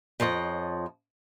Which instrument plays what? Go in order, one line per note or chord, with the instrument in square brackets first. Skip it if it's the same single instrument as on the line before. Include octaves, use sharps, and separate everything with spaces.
[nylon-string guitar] F2 F3 C#5 D#5